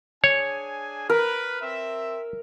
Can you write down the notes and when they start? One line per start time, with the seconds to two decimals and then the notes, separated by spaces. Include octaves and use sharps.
0.24 D4 G#4 C#5 G#5
1.10 A#4 B4
1.62 C4 E5